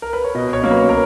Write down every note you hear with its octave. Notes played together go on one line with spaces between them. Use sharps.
A#4
B4
C#5
B2 D#5
C#5
F#3 A#3 C#4
B4
A#4